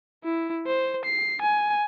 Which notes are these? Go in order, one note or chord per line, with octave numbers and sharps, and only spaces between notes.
E4
C5
C7
G#5